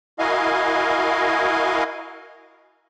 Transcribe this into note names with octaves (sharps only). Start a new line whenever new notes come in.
E4 F#4 A#4 D#5 F5 G#5